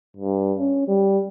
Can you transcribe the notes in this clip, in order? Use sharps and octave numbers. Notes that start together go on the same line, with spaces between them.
G2
C#4
G3